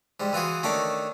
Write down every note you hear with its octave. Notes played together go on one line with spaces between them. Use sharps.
G#2 G3
E3 F4 F#4 G#4
D#3 A3 C#4 D4 A#5 D6